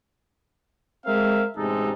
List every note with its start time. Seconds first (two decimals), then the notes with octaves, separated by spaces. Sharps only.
1.05 G#3 C4 A#4 E5 F5
1.57 A1 C3 G#3 D#4 A4